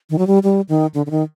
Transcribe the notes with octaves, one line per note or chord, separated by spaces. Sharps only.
D#3
F#3
G3
G3
D#3
D3
D3
D#3